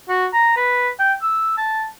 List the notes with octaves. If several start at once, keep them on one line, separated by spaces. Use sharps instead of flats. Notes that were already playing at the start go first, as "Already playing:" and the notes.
F#4
A#5
B4
G5
E6
A5